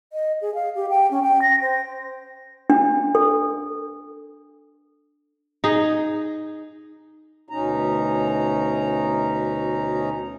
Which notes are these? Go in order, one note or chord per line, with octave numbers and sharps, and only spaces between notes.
D#5
G#4
F5
G4
G5
C#4
G5
A#6
C5
D4
A4
D#4 G#4
D2 B2 C#4 D#4 A#5